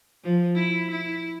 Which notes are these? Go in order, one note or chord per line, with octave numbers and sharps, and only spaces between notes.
F3
E4
E4